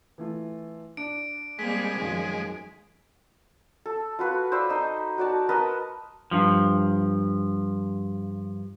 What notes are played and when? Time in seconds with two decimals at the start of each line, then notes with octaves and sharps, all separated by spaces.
0.18 E3 A3 F4
0.97 D4 D7
1.59 G3 G#3 A#3 C4 B6
1.97 F#2 D#3 F3
3.86 A4
4.19 F4 F#4 B4
4.52 C5 D5 B5 E6
4.69 D#4 D#5
5.18 F#4 D5 A5
5.49 A#4 B4 D#5 A5
6.31 G2 F3